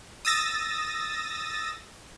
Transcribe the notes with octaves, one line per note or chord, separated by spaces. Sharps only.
D#6 E6 A6 A#6